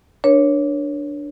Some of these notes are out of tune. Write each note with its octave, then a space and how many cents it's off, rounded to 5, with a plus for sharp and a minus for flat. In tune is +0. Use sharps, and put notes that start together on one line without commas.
D4 +0 A#4 +40 C#5 +0